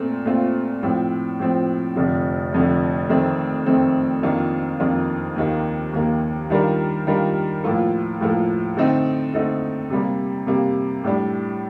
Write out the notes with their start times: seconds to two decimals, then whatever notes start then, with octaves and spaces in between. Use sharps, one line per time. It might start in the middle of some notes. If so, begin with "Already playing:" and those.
Already playing: A#2 A3 C4
0.25 A#2 A3 C4 F4
0.83 A2 F3 C4
1.39 A2 F3 C4
1.95 F1 F2 D3 F3
2.53 F1 F2 D3 F3
3.09 F2 D#3 A3 C4
3.66 F2 D#3 A3 C4
4.23 F2 D#3 A#3 D4 F4
4.80 F2 D#3 A#3 D4 F4
5.36 D#2 D#3 A#3
5.93 D#2 D#3 A#3
6.50 D#3 G3 D4 F4 A#4
7.07 D#3 G3 D4 F4 A#4
7.64 A2 F3 A#3 F4 A4
8.21 A2 F3 A#3 F4 A4
8.77 D3 A3 C4 D#4
9.34 D3 A3 C4 D#4
9.90 C3 G3 A#3
10.47 C3 G3 A#3
11.04 A2 G3 D4